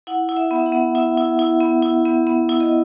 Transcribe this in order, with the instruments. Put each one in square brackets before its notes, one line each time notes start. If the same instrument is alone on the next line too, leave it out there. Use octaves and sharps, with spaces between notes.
[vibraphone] E4 F#5
E4
E5
B3
E5
F#5
B3
E4 E5
E4
E4
B3
E4
B3
B3
E4
D#5